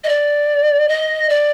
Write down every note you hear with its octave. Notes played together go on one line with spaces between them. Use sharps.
D#5
D5
D#5
D5